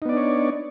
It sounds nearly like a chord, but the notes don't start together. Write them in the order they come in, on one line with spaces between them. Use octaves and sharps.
D#4 B3 D5 D4 C#5